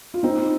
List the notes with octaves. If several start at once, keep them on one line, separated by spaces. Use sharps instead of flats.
F4
C4 D#4